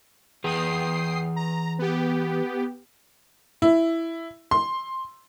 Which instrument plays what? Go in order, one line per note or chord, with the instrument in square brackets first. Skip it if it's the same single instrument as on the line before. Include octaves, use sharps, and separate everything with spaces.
[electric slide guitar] E3 G#4 B4 [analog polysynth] G5 D#6 C7
[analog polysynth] A#5
B3 G4
[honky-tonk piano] E4
C6